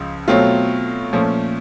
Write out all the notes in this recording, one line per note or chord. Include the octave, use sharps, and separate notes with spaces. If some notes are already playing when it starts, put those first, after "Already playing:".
Already playing: C#2 C#3 F3
B2 F#3 A3 C4 F4
A#2 F3 A3 C#4